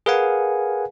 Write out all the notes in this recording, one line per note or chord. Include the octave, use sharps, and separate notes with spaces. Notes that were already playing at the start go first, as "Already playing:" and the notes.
G#4 A#4 B4 F5 F#5 G#5